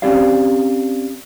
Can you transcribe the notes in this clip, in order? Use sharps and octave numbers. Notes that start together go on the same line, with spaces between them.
C4 C#4 G4 D5 F5